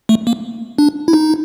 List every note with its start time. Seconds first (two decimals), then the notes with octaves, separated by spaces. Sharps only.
0.09 A3
0.27 A#3
0.78 D4
1.08 E4
1.13 D#4